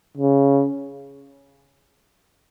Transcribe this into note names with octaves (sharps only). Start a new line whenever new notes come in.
C#3